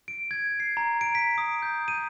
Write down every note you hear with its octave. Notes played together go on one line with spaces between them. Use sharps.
D7
G#6
C7
A#5
D7
B6
D#6
G6
D#7